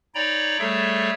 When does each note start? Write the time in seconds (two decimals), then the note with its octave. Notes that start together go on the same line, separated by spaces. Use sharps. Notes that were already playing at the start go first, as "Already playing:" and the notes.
0.15 D#4 C#5 D5 G5 A#5 B5
0.59 G3 A3 G#4 A4 C#5 E5